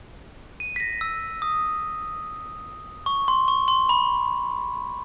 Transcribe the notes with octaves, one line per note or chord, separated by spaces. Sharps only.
D#7
B6
A#6
E6
D#6
C#6
C6
C#6
C6
B5